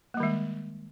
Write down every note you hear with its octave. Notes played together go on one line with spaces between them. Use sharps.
D#3 G3 G#3 A#3